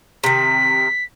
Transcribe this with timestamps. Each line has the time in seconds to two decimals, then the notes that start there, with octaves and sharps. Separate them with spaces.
0.24 C3 D#3 B6